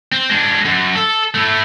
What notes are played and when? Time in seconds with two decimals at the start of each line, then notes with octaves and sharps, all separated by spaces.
0.12 C4
0.30 G#3 D4
0.65 F#2
0.95 A4
1.34 A3 E4